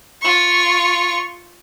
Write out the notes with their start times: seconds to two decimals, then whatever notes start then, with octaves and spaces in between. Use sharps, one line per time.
0.22 F4 C#6